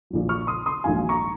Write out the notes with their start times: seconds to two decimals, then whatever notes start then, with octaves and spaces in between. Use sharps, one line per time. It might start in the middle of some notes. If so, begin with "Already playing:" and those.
0.10 A#1 A#2 F#3
0.29 C#6 F6
0.47 C6 D#6
0.66 C6 D#6
0.84 A#1 G#2 D#3 F#3 F5 G#5
1.09 A#5 C#6